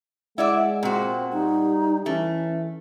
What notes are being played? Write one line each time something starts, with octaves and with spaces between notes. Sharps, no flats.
G#3 E4 D5 E5 F#5
A#2 C4 F#4
G3 D#4
E3 A3 C#4